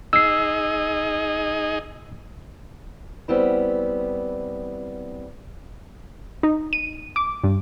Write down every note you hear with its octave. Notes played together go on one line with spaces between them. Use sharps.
D#4 G#4 D#5 E6 C7
G3 B3 C4 E4
D#4
D#7
D6
G2